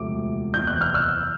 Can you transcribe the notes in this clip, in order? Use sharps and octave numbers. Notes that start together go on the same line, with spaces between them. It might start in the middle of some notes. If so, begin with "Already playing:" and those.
Already playing: E1 D2 C3 F3 A3 D6
F#1 E2 C3 E3 G6
F#6
F6
E6 F#6